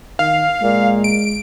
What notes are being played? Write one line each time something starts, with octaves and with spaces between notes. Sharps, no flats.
D#3 F5
A#2 G#3
D7